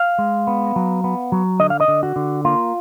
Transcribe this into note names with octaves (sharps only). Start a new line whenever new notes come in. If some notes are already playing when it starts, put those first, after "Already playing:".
Already playing: F5
G#3
B3
F#3
B3
F#3
D3 D#5
F5
D#5
D3
F#4
D3
A#3 F4